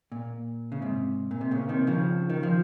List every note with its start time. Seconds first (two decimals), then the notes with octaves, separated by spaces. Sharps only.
0.12 A#2
0.72 C#3
0.82 G#2 C3
1.31 A#2
1.41 C3
1.51 A#2 C#3
1.69 C3 D#3
1.87 C#3 F3
2.30 D#3
2.43 F3